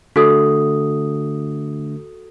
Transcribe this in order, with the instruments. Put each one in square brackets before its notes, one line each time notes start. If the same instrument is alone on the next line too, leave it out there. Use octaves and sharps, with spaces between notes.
[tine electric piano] D3 A3 [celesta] F#4 A4 D#6